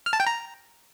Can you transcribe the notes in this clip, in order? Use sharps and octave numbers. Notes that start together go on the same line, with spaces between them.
F6
A5
G5
A#5